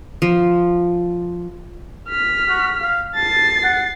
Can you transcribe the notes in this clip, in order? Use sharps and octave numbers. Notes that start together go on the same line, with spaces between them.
F3
F6 B6
F#4
F5
A5 A6 C7
F#5